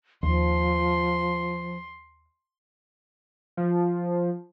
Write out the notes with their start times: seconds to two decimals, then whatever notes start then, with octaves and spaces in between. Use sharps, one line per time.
0.23 D#2 F3 C6
3.57 F3